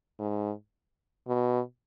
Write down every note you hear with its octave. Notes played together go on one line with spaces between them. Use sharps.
G#2
B2